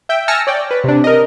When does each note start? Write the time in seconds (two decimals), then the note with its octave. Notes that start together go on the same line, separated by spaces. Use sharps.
0.09 E5 G5
0.28 G#5 A5 E6 F6 A#6 C#7
0.47 C#5 D5 G5
0.71 B4
0.84 C3 D4
1.04 A#4 D#5